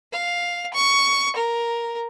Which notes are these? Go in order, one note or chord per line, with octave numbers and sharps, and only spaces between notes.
F5
C#6
A#4